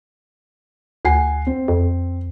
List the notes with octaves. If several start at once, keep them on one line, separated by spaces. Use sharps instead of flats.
D2 F#5 G#5 C7
C4
F2